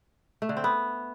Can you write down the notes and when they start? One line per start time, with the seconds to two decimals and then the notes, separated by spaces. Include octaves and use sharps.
0.42 A3
0.49 D3
0.57 C4
0.64 B3